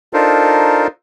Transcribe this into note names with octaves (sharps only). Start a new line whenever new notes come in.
D4 D#4 F4 A4 A#4 C5